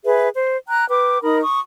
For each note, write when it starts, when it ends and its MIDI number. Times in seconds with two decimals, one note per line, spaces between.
0.05 0.28 68
0.05 0.28 71
0.05 0.28 76
0.35 0.56 72
0.69 0.88 79
0.69 0.88 82
0.69 0.88 90
0.89 1.23 71
0.89 1.23 79
0.89 1.23 86
1.23 1.40 63
1.23 1.40 70
1.23 1.40 83
1.23 1.40 87
1.42 1.59 85
1.42 1.59 87